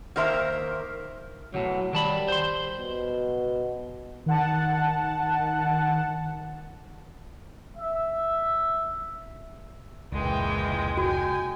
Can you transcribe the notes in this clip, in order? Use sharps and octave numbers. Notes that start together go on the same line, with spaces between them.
D#3 A#3 A#4 C5 E5 A#5
B1 A2 C#3 F#3
D#3 G3 A5 B5
C5 C6
B2
D#3 F#5 A5
E5
F1 C#2 A#2 D#3 E3 G#3 G5
F#4 G5 G#5